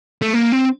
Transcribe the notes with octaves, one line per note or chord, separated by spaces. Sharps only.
A3
A#3
C4